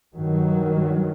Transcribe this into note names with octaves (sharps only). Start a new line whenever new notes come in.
G2 D#3 F#3